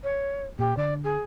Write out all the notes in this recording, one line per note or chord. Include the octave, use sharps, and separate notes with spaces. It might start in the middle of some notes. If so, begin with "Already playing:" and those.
C#5
A#2 G4
D3 D5
G#4